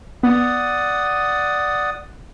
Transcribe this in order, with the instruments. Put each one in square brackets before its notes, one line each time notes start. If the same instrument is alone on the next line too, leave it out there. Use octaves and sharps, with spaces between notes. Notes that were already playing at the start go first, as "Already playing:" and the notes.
[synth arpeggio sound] B3 [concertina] D5 F#5 D#6